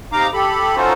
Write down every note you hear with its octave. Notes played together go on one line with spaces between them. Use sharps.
C3 D#4 F5 A#5 D6
G4 A4 B5
C#4 D#4 F4 F#4 A4 C5